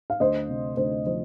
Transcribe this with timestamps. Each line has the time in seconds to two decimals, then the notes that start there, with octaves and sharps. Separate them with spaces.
0.10 F5
0.20 D2 C5 D#5
0.49 C3
0.77 D2 C5
1.06 F3 C5